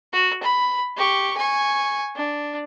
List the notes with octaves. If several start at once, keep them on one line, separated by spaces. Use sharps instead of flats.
F#4
B5
G4 C#6
G#5 C#6
D4